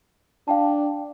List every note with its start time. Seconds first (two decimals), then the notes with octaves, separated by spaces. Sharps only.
0.48 D4 F5 G5 A5